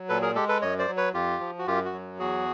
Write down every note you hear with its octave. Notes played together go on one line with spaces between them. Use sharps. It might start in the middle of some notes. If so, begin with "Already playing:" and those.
Already playing: F#3
A#2 A4 B4
G#4 A#4
G#3 G4 A4
A4 B4
F#2 C#5 D#5
C5 D5
F#3
B4 C#5
F2 F4 G4
F3
F#4
F#2 F4 G4
F#4
F#3
E2 F#4 G#4